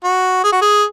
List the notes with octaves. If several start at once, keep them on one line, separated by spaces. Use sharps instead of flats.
F#4
G#4
F#4
G#4